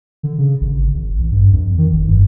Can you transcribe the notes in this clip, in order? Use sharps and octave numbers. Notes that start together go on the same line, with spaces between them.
D3
C#3
G#1
G#1
A1
G2
F2
D#3
G1
G2